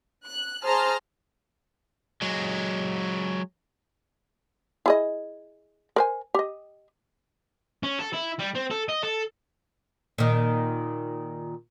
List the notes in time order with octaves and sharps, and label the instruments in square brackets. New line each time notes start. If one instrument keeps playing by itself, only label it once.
[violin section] F#6
G#4 C5 A5 A#5 C6 F6
[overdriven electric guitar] F#3 G#3
[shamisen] E4 G#4 D#5
A#4 C5 G#5
G4 D#5
[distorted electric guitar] C#4
A4
E4
G3
C4
A4
D#5
A4
[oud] A#2 D#3